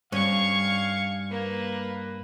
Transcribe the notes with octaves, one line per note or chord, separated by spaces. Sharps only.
G2 C#4 F5 C#6 G#6
A#3 B4